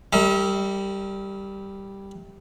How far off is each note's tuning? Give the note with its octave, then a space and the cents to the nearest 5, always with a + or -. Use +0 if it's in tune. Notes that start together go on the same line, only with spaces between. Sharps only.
G3 +0 A#4 -45 E5 -45